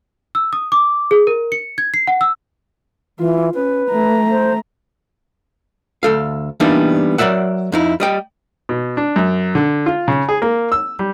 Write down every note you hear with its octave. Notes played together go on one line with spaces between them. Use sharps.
E6
D#6
D6
G#4
A#4
C#7
G#6
C7
F#5
E6
E3 F4
C#4 B4
A3 A#5
C5
D2 A4 F5
E3 G3 A#3 B3 D4 D#4
F#3 A#4 D5 E5 F#5
F2 D#4 E4
G3 D#5 G5
B2
D4
F#2
D3
F4
C#3
G#4
A#3
E6
G3